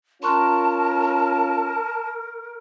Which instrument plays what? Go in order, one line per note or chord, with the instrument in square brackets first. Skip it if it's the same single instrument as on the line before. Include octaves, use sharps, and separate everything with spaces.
[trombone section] C#4 F4 [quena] A#4 [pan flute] A5 [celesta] C6 C#6 F#6